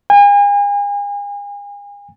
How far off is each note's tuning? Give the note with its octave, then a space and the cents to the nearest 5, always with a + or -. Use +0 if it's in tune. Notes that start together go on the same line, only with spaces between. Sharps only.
G#5 -40